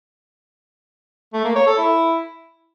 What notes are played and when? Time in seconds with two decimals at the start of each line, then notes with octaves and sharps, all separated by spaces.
1.33 A3
1.44 A#3
1.56 C#5
1.67 A4
1.78 E4